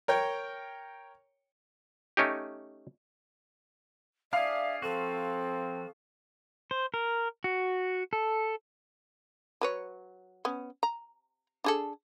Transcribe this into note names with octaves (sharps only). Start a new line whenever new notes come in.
A#4 C#5 G5
A3 C#4 D#4 G4
D4 G#4 D5 E5 F5
F3 C4 F#4 A4
C5
A#4
F#4
A4
F#3 B4 C#5
B3 C#4
A#5
D4 G#4 A4